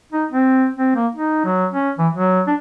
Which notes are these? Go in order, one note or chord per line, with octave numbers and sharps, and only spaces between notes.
D#4
C4
C4
A#3
D#4
F#3
C#4
E3
F#3
D4